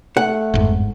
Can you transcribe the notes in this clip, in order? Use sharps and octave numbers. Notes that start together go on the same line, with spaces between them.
A3 F#5
G1 F2 G#2